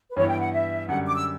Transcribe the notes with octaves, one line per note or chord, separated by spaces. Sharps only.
B4
G2 E3 B3 E4 C#5
G5
F#5
E5
F#2 D3 G3 F#5
D6
E6